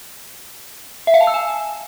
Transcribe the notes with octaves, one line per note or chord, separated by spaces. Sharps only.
E5
F5
A5
E6
G#5